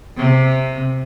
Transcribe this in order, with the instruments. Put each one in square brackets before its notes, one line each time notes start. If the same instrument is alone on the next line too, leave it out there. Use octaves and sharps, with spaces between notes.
[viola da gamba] C3